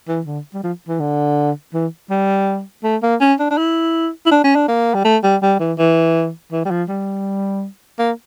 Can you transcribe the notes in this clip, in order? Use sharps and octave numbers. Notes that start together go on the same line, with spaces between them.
E3
D3
G3
F3
E3
D3
E3
G3
A3
A#3
C#4
D4
D4
E4
E4
D4
C#4
D4
A#3
G3
A3
G3
G3
E3
E3
E3
G3
F3
G3
A#3